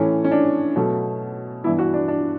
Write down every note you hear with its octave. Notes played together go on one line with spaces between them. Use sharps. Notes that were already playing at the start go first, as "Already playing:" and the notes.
Already playing: A2 E3 A3 C#4
C#4
D4
B2 F#3 A3
G2 E3 B3 E4
F#4
D4
D4